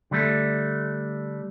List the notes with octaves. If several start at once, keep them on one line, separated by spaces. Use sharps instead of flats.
D3 G3 A3